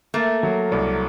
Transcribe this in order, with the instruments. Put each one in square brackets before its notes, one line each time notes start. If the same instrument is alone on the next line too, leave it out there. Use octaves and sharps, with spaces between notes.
[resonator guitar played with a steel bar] A3 [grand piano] A#3
[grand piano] F#3
C2